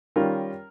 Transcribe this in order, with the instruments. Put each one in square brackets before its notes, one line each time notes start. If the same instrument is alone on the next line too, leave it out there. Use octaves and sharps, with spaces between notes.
[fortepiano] D#3 G3 C#4 F4 A#4